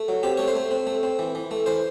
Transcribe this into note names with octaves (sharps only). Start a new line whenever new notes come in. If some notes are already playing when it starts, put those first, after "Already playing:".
Already playing: A3
F#3
C4 G4
A3 C#5
C5
A3
C4
A3
C4
E3
E3
A3
E3 C5